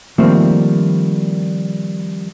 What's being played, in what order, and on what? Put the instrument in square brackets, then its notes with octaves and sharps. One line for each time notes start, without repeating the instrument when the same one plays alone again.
[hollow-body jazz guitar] D#3 F3 G3 A3 A#3 C4